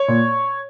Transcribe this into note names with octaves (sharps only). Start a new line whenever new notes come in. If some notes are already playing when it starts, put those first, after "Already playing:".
Already playing: C#5
A#2